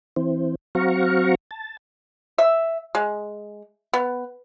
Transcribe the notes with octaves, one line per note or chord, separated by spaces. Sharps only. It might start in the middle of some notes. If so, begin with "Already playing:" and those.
E3 C4
F#3 C4 F#4 F5 A#5 C#6
A5
E5
G#3
B3